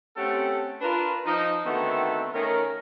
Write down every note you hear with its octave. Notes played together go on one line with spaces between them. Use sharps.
A3 C4 C#4 G4 A4 F#5
D4 F4 A#4 B4
F3 D#4
D3 D#3 A3 B3 C4 F#4
D#3 A3 C#4 A#4